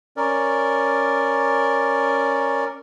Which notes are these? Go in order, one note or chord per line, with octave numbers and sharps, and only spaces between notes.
C#4 A#4 D5